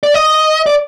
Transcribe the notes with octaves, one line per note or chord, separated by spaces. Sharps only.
D5
D#5
D5